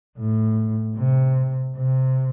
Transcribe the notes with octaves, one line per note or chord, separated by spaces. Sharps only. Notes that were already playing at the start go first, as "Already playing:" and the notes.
A2
C3
C3